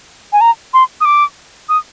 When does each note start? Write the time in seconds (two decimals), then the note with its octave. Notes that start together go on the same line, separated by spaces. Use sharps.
0.33 G#5
0.41 A#5
0.74 C6
1.01 D#6
1.05 D6
1.69 D#6